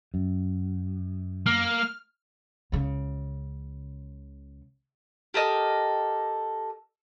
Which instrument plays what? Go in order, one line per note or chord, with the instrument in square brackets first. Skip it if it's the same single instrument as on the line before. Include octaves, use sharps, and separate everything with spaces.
[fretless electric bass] F#2
[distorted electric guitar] A#3 [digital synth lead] F6
[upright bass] C#2 C#3
[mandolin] G4 A4 A#4 D#5